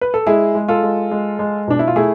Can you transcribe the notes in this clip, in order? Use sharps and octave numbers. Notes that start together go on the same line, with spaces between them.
B4
A4
G#3 E4 G#4
G#3
F4 A4
G#3
G#3
G#3
B2 D4
E4
F4
A3 E4 G#4